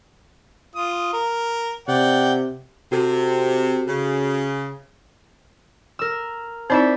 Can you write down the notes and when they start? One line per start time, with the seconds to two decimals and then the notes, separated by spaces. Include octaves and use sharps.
0.75 F4 D#6
1.13 A#4
1.88 C3 D5 F#5 G5
2.92 C3 F#4 A4
3.87 C#3
5.99 A#4 E6
6.70 C4 D#4 E4 C5 D5 E5